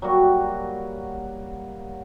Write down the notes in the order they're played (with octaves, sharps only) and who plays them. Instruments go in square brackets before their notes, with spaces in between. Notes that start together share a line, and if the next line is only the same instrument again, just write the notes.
[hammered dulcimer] F#3 G3 A#3 F#4